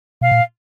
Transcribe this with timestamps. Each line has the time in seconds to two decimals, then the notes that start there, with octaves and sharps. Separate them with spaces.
0.21 B2 F5
0.32 A#2